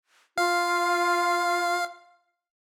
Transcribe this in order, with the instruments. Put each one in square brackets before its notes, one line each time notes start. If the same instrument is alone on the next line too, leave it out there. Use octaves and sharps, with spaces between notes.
[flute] F4 [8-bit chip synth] F5